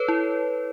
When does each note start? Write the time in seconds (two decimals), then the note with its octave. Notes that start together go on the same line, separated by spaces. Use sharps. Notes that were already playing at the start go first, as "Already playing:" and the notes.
Already playing: A4 B4 C#5
0.08 E4